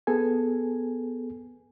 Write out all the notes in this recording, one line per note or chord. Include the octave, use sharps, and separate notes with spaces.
B3 G#4 A4 G#5